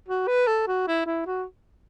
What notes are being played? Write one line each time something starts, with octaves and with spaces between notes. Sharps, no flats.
F#4
B4
A4
F#4
E4
E4
F#4